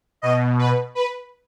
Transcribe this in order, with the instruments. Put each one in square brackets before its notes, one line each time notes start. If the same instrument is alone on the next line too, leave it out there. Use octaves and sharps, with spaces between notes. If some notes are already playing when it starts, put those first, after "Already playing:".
[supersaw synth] B2 D#5
B4
B4